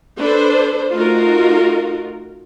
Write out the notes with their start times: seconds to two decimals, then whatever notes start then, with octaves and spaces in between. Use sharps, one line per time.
0.20 D4 A4 B4 C5
0.93 A3 D#4 F4 F#4 A#4